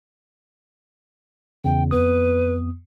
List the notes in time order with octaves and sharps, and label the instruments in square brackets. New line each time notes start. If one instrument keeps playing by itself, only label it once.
[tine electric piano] E2 C#3 [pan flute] G5
[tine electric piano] F2 B3 D#6 [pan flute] B4